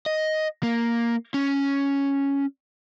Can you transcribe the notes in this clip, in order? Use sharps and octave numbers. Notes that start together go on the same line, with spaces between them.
D#5
A#3
C#4